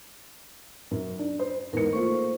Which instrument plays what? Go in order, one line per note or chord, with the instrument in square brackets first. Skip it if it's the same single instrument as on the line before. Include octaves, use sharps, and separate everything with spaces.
[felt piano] F#2
D4
C5
[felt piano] E2 G#2 C#7 [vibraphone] A#4
[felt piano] A3 A#3 F4 [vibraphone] C5 C#6